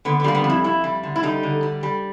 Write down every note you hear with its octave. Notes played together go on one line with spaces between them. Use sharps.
D3 B3
B3
G3 A#3
B3
F2
E4
F2 E4
G3
D3
E4
G3 D#4
D3
G3
G3